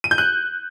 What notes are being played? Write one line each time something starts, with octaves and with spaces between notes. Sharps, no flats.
D#7
G6
F#6